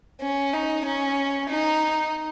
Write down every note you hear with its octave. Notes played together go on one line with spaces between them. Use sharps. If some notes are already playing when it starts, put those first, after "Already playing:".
C#4
D#4
C#4
D#4